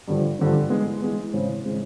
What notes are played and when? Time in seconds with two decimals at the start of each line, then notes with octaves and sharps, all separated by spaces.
0.08 G2 D3 F3
0.39 G2 D3 F3
0.70 E3 G#3 B3
1.02 E3 G#3 B3
1.33 C#3 E3 G#3 C4
1.65 C#3 E3 G#3 C4